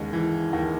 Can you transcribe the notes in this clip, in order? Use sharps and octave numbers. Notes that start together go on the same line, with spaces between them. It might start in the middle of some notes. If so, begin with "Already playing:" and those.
Already playing: D#2 C#3 G#3
E3
D#2